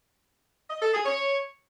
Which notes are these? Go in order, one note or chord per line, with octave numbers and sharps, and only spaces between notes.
D#5
A4
G#4
C#5